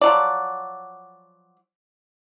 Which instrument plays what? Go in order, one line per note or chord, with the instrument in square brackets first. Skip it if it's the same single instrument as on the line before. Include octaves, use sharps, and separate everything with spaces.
[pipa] F3 F#3 D5